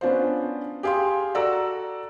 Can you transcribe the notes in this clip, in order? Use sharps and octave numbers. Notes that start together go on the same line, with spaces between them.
B3 C#4 D4 F4 C5
G4 G#4 F5 G5 C6
F#4 A4 D5 A#5 E6